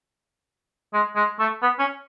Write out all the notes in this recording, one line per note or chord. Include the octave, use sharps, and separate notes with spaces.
G#3
G#3
A3
B3
C#4